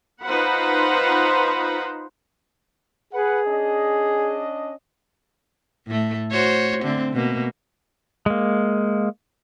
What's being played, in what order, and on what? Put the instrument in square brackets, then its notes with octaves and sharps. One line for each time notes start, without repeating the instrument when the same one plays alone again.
[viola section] D#4 F4 B4 C5 F#5 B5
[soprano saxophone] G#4 [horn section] B4 F#5
[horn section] C#4 D4 D#5
[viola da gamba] A2 A3
F#4 C5 C#5
D3 A3 C4
B2 A#3
[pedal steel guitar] G#3 A#3